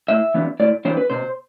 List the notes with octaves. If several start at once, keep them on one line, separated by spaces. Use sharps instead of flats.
A2 E5
E3 B3 D4
A2 D5
E3 B3 D4 C5
B4
B2 C5